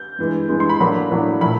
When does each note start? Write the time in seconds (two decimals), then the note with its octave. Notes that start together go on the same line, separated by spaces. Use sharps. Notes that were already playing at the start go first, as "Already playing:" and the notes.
Already playing: G6
0.19 G2 E3 G#3
0.49 G2 E3 G#3
0.60 C6
0.69 B5
0.80 A2 F#3 A#3 D4 B5
1.11 A2 F#3 A#3 D4
1.41 A#2 F#3 A3 B5